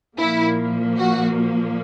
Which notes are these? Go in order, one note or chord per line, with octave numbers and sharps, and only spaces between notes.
A#2 F3 A#3 E4
F#4